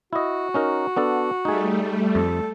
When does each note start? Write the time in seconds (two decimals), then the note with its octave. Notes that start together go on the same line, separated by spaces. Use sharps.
0.13 E4 F#4 D#5
0.54 C#4 D#4 A#4
0.96 B3 D4 A4
1.45 G3 A3 D#4 G#4
2.15 F2 A4